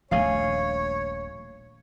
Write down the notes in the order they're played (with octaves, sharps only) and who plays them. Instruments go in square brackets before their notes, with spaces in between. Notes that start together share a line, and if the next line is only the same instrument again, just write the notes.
[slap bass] D#1 A#1 A3 [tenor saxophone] C#5 [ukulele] F5 G#5